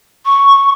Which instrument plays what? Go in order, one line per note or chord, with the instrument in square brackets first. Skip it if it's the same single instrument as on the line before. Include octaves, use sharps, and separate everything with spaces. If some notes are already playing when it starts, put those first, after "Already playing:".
[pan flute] C#6